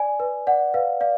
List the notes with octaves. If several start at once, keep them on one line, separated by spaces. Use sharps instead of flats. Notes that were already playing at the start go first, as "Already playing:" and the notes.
Already playing: D5 G#5
B4
D5 F#5
B4 F5
D5 F5